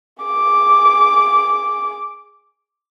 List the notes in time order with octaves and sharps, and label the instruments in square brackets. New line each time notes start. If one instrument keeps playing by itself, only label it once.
[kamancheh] G#4 D6